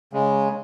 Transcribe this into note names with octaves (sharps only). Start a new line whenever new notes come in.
C#3 G#3